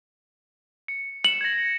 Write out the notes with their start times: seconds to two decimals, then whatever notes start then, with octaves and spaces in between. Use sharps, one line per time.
0.88 C#7
1.24 C#7 E7 F#7
1.41 G#6 A#6